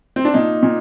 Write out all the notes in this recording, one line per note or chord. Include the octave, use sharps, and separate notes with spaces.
C4
D4
A#2 D#4
A#2